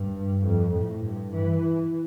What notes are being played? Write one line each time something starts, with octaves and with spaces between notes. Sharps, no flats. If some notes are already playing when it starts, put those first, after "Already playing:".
Already playing: G2
F2
A2
G2
E3